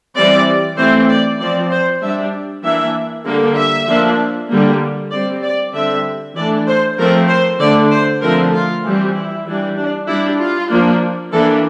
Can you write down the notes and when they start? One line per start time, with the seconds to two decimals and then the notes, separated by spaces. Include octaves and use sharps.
0.16 E3 G3 C4 D5
0.77 E3 A3 C4 C5
1.09 D5
1.39 F3 C4 D5
1.71 C5
2.01 G3 D4 E5
2.63 E3 A#3 D4 E5
3.25 D3 G3 A#3
3.57 E5
3.87 F3 A#3 D4
4.49 D3 G3 A#3
5.11 G3 C4 D5
5.43 D5
5.73 D3 G3 C4 E5
6.36 E3 A3 D4 D5
6.67 C5
6.98 F3 A3 C4 A#4
7.28 C5
7.59 D3 A3 D4 D5
7.90 C5
8.21 D3 F3 A3 C4 A#4
8.52 F4
8.84 E3 G3 C4
9.14 E4
9.45 E3 G3 D4
9.77 D4
10.07 G3 D4 E4
10.40 F4
10.70 F3 A#3 D4
11.32 E3 A#3 D4 A4